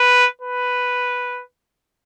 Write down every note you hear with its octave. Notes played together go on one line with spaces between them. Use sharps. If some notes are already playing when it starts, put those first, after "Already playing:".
Already playing: B4
B4